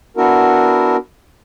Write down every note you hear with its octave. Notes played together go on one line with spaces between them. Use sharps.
B3 D4 E4 F#4 A#4